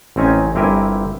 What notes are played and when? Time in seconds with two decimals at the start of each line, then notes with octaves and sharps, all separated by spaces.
0.16 A1 C4 C#4 D#4 G#5
0.55 G1 C4 E4 G4 A#4 G#5